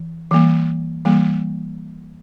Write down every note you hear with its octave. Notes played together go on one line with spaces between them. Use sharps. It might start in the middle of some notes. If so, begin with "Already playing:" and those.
Already playing: E3
E3 G3 A#3
E3 G3 A#3